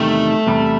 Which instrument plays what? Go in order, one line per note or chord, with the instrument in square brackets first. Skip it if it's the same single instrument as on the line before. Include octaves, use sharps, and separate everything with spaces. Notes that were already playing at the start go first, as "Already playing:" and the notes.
Already playing: [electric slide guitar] E2 C3 D#3 G3 [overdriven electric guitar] A3
[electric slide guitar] E2 C3 G3